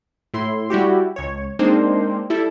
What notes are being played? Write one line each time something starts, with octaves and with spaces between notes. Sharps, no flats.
A2 E4 C6
G3 E4 F#4 G4
C#2 C#5
G#3 A#3 C4 D4 D#4 C5
G3 E4 A4